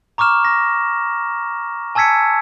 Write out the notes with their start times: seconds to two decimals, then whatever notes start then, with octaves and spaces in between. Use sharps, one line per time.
0.18 A#5 C#6 D6 F6 E7
0.45 A#6
1.95 G#5 A5 E6 G#6 B6 C#7